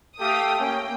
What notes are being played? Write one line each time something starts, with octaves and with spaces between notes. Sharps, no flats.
A3 G4 A4 F5 G5 D#6
A#3 C#4 G5